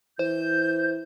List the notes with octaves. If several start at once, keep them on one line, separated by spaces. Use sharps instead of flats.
E3 C5 G6